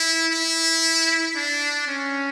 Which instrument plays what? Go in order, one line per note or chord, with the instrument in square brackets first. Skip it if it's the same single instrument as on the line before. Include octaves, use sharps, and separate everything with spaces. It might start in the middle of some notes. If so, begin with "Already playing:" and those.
Already playing: [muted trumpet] E4
E4
D4
C#4